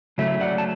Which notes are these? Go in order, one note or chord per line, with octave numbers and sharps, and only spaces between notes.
C#3 F#3 A3 E5
D5 F#5
A5